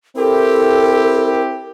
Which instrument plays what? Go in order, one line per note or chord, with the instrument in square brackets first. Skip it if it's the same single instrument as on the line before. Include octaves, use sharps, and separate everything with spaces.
[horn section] C4 E4 G4 [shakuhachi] A4 [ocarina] A#4